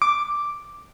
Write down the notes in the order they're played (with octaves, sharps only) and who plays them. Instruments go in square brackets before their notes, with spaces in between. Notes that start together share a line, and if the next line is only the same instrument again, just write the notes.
[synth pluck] D6